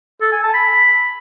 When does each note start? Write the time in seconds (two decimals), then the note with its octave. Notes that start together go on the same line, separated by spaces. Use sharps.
0.21 A4
0.32 G#5
0.43 A5
0.54 B5